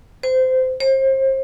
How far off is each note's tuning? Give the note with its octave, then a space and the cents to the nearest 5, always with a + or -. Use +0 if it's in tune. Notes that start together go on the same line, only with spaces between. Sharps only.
C5 -20
C5 +35